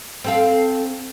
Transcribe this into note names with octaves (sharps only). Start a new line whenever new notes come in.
C4 A4 F5